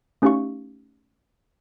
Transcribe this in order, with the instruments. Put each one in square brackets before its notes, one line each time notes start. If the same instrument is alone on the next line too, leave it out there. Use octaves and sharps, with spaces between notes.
[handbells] A3 C#4 D#4 G4 F5 C#6